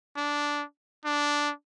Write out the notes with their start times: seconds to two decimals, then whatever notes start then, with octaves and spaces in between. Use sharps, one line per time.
0.17 D4
1.05 D4